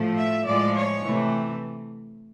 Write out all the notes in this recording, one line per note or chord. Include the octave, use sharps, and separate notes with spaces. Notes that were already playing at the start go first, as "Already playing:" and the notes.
Already playing: A2 F3 A3
E5
A2 F3 G#3 D5
C#5
C3 E3 A3